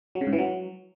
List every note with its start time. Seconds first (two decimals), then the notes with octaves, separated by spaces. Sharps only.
0.15 F#3
0.21 C#3
0.27 G#2
0.33 E3
0.38 F#3